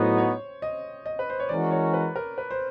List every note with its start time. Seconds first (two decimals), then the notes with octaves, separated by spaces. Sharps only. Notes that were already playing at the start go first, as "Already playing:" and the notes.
Already playing: A2 F#3 B3 D#4 F#4 C5
0.18 C#5
0.62 D#5
1.06 D#5
1.19 B4
1.30 C5
1.40 C#5
1.49 E3 G#3 C#4 F#4 A#4 D5
1.71 C#5
1.93 B4
2.16 A#4
2.38 B4
2.51 C5